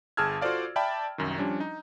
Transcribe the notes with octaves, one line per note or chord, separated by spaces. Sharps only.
G1 G#4 A5 E6 F6 G#6
F4 F#4 A4 C5 D5 F5
D5 E5 G5 A5 B5
C2 F#2 D#3
F3 G3 C#4 D4
D#4